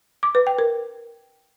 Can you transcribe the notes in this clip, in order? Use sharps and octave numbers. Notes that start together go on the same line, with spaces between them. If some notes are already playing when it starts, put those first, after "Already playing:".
D6
B4
G5
A#4